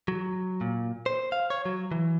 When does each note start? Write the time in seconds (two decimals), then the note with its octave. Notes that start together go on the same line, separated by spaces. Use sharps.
0.08 F#3
0.61 A#2
1.06 C5
1.32 F5
1.50 C#5
1.66 F#3
1.91 E3